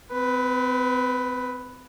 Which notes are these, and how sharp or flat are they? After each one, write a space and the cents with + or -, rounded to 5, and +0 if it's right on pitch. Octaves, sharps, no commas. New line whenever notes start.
C4 -35 B4 +5